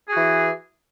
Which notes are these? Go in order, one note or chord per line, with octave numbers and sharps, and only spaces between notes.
E3 F#4 G#4